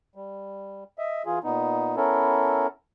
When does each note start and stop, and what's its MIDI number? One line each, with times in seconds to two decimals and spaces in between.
0.15 0.84 55
0.98 1.23 75
0.98 1.23 76
1.26 1.39 52
1.26 1.39 65
1.26 1.39 68
1.44 1.96 46
1.44 1.96 59
1.44 1.96 63
1.96 2.67 59
1.96 2.67 61
1.96 2.67 64
1.96 2.67 69
1.96 2.67 70